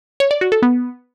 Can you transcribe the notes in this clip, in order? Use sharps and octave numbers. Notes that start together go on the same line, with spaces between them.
C#5
D5
F#4
A4
B3